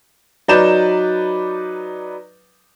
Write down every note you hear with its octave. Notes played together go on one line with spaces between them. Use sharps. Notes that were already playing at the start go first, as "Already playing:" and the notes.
F#3 D#4 B4 D5 G6 E7